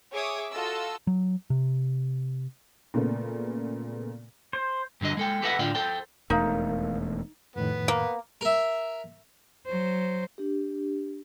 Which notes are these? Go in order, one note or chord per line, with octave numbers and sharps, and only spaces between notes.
G#4 C#5 E5 D6 D#6
F4 F#4 A4 D#5 A5 E6
F#3
C3
A#2 C#3 A3 B3
C5
G2 D3 F#3 D#5
G#3 A4 G5
G4 A4 B4 D#5 E5 F#5
A2 D3 F4 D5 G5
A4 C5 G5
E1 F2 A3 D#4 A#4 F5
F2 A2 D#3 B3
A#3
A#4 E5
F#3 C5
D4 G4